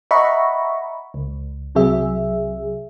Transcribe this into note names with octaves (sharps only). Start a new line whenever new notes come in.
D#5 E5 F#5 A#5 B5 C#6
C#2
C2 C3 F#3 G#4 E5